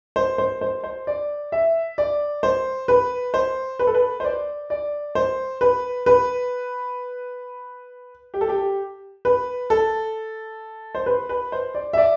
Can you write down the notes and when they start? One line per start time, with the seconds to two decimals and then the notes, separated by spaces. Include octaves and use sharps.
0.16 C5
0.38 C5
0.61 C5
0.84 C5
1.07 D5
1.52 E5
1.98 D5
2.43 C5
2.88 B4
3.34 C5
3.79 B4
3.87 A4
3.95 B4
4.20 C5
4.24 D5
4.70 D5
5.15 C5
5.61 B4
6.06 B4
8.34 G4
8.41 A4
8.49 G4
9.25 B4
9.70 A4
10.95 C5
11.06 B4
11.29 B4
11.52 C5
11.75 D5
11.93 E5
11.98 D5